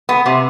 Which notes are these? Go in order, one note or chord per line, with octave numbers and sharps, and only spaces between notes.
B3
C3